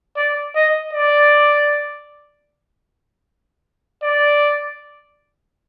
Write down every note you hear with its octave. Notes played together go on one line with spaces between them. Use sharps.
D5
D#5
D5
D5